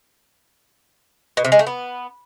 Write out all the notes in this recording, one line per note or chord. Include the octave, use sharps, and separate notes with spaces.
B2
C3
G#3
A3
B3